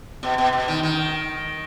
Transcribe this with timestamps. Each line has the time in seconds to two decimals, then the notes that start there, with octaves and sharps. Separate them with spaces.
0.23 B2
0.38 B2
0.53 B2
0.68 D#3
0.83 D#3